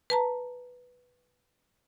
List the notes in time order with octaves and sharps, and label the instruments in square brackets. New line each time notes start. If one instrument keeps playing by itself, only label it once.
[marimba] B4 A5 A#5